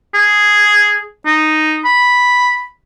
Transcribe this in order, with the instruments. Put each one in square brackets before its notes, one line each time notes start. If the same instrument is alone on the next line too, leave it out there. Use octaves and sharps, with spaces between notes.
[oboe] G#4
D#4
B5